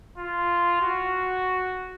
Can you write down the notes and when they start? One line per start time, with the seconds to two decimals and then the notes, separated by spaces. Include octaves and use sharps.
0.18 F4
0.82 F#4